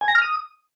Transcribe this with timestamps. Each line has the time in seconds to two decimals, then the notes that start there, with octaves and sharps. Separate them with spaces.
0.01 G#5
0.08 A#6
0.15 F6
0.22 D#6